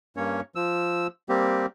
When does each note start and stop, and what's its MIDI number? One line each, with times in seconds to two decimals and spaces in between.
0.17 0.41 43
0.17 0.41 58
0.17 0.41 61
0.17 0.41 73
0.55 1.07 53
0.55 1.07 88
1.29 1.66 55
1.29 1.66 58
1.29 1.66 60
1.29 1.66 67